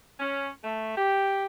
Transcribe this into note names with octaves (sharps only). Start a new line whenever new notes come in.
C#4
A3
G4